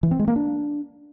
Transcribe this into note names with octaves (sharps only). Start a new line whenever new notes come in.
E3
C4
G#3
A#3
D4